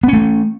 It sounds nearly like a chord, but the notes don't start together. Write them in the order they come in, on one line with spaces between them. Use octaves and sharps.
B3 C#4 A3